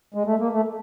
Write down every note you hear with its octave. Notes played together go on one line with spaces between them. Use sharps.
G#3
A3
A#3
A3